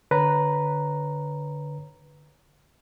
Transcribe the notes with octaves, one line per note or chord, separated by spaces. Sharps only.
D3 B4 C#5 A#5